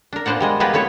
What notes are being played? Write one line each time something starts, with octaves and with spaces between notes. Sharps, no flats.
D4 A#4
A#2 B3 D4 C5 D5 F#5
G3 G#3 D#5
B3 F4 G4 G#4 A#4 B4
A3 B3 E4 C#5